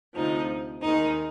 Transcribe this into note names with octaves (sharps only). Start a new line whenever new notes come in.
D2 C3 F3 D#4
D#2 D#3 G#3 D#4